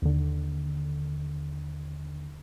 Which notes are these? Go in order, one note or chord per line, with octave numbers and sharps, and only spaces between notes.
D#2 D3